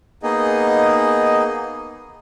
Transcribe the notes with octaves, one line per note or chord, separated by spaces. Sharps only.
A#3 B3 D#4 G#4 D#5